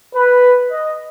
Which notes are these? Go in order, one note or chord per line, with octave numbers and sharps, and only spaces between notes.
B4
D#5